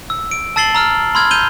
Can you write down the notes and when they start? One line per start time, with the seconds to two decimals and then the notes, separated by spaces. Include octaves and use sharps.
0.10 E6
0.31 D7
0.56 A5 E6 A6 C7 F#7 G7
0.75 A#5 E6 F6
1.15 B5 C6 E6 F6 G#6
1.31 G6 D#7 F7 G7